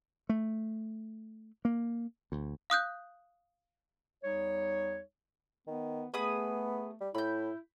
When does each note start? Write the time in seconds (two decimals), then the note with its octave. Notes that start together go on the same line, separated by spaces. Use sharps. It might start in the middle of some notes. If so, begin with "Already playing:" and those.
0.29 A3
1.65 A#3
2.32 D2
2.70 F5 D#6 F#6 G6
4.24 E2 G3 D#4 C#5
5.67 D#3 B3
6.14 A3 B3 G#4 B5 D#6
7.00 G3
7.15 A2 E4 B5 G6